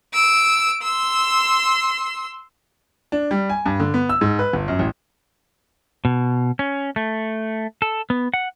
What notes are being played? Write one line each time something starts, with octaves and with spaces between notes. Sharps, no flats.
E6 D7
C6 E6
D4
G3
G#5
G2
D3
B3
E6
G#2
B4
G1
F#2
A1
B2
C#4
A3
A4
B3
F#5